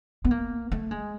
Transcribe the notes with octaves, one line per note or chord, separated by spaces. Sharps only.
B3
A#3
A3
G#3